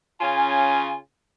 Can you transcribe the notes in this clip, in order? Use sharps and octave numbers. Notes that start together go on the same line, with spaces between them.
C#3 C#4 F4 G#5